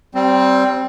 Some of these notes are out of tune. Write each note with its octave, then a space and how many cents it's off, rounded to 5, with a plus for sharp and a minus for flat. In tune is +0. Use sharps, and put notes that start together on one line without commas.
G3 -25 C4 +0